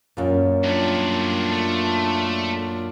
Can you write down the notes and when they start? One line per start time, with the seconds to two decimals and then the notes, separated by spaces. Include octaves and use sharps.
0.17 F#2 A#2
0.64 G2 A3 D4 F4
1.52 A3